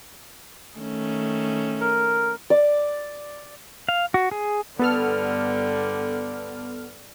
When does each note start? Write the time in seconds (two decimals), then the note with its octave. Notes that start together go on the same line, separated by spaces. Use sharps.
0.78 D#3 A3 C#4
1.81 A#4
2.50 D5
3.89 F5
4.14 F#4
4.31 G#4
4.79 G2 D3 G3 B3 A4 F6